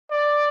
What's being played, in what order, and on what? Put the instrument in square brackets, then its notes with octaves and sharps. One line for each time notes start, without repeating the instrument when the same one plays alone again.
[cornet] D5